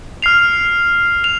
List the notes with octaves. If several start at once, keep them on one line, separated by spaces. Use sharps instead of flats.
F6 C7 F7
F7